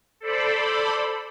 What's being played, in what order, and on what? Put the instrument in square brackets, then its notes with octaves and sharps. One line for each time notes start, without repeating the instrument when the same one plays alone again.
[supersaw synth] A4 C5 D5 B5